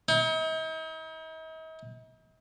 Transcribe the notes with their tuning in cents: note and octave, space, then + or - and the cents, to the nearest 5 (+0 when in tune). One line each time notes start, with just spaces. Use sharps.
D#4 +45